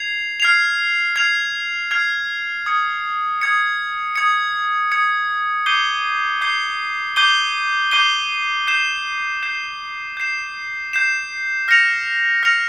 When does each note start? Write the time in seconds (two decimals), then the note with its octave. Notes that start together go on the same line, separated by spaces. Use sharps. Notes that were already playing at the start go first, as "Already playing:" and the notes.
Already playing: G#6 C7 F7
0.40 F6 G#6 C7 F7
1.16 F6 G#6 C7 F7
1.91 F6 G#6 C7 F7
2.66 D#6 G#6 C#7
3.41 D#6 G#6 C#7
4.16 D#6 G#6 C#7
4.92 D#6 G#6 C#7
5.66 D6 G6 C7 D#7 G7
6.41 D6 G6 C7 D#7 G7
7.16 D6 G6 C7 D#7 G7
7.91 D6 G6 C7 D#7 G7
8.67 G6 C7 E7
9.43 G6 C7 E7
10.17 G6 C7 E7
10.93 G6 C7 E7
11.68 F6 A#6 C#7 F7
12.43 F6 A#6 C#7 F7